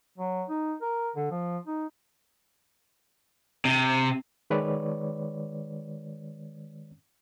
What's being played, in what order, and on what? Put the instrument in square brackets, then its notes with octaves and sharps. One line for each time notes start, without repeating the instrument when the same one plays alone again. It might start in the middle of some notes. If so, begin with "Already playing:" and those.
[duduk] F#3
D#4
A#4
D3
F3
D#4
[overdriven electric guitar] C3
[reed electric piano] D#3 G#3 B4 C#5 D5